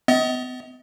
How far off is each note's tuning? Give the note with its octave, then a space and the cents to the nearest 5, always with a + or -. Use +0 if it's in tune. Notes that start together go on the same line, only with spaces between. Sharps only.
B3 +35 D#5 +35